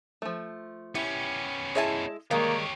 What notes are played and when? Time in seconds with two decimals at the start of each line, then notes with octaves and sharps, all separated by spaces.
0.22 F3 A3
0.95 B3 C#4 E4 G4
1.75 G#3 E4 C#5 E5 G#5 A5
2.31 D#3 G3 G#3 A#3 G4 C#5 F5